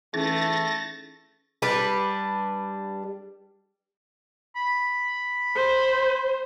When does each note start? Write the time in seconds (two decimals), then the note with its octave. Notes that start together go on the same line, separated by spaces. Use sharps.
0.14 E3 A3 C#4 D#4 G#4 A6 A#6
1.62 G3 D4 B4
4.56 B5
5.55 C5